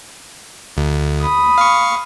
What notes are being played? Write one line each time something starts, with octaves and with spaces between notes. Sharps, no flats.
D2
B5 D#6
F5 C#6